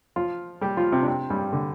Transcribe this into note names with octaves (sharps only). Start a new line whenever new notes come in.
F3 F4
G3 G4
F3 F4
C3 C4
D4
C3 C4
G2 G3
D3